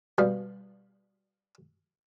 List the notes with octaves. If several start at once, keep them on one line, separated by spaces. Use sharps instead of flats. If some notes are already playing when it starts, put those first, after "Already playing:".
B2 G3 F5